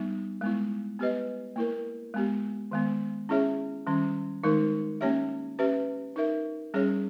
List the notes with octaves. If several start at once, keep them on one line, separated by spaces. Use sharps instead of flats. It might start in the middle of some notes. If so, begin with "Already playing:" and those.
Already playing: G3 B3 D#4
G#3 B3 E4
B3 G4 B4 D#5
A#3 E4 A#4
G#3 B3 G4
D#3 G#3 B3
C#4 E4 G#4 C#5 E5
D#3 G3 C#4
D#3 G#3 D#4 A#4
A#3 C#4 G4 C#5 E5
C#4 G4 B4 E5
D#4 A#4 E5
G3 C#4 G#4 C#5